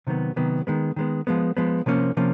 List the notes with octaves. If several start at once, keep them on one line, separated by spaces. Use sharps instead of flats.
C3 D#3 F#3 B3
C3 D#3 F#3 B3
D#3 G#3 B3
D#3 G#3 B3
F3 G#3 B3
F3 G#3 B3
C3 F3 A#3 C#4
C3 F3 A#3 C#4